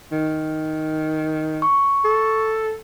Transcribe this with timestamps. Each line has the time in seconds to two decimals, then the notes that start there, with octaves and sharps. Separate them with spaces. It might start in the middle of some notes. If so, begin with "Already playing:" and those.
0.12 D#3
1.62 C#6
2.05 A4